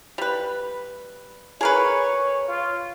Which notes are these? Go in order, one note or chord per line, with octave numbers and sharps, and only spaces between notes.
G3 B4
G#4 A#4 B4 C#5
F4